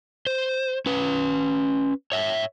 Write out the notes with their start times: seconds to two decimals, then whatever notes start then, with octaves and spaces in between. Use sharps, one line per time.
0.27 C5
0.86 C#4 B4
2.12 C#5 E5